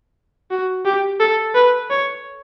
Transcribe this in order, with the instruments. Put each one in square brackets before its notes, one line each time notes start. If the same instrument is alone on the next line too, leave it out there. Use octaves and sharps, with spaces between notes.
[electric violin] F#4
G4
A4
B4
C#5